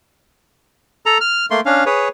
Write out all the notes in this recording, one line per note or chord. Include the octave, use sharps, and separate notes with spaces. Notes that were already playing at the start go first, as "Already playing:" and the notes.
A4 A#5
F6
A3 A#3 C6
C#4 D4 F5
G#4 B4 C#5